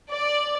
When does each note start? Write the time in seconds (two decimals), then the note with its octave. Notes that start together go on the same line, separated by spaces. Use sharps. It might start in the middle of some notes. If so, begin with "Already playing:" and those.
0.12 D5